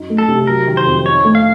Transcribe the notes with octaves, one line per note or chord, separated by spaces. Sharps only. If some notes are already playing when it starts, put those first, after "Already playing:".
Already playing: F#2 D#4
A3
A4
C3
F#3 A#4
D#3
C5
F2
D#4 C#5
A3
F5